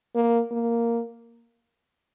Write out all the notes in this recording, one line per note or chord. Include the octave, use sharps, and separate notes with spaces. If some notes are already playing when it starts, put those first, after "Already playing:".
A#3
A#3